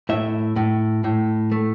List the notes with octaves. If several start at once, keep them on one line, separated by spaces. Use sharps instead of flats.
A2 E5
A2
A2
A3